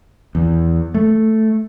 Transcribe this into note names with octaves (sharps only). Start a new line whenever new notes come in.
E2
A3